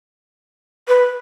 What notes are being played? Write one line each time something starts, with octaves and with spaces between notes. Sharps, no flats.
B4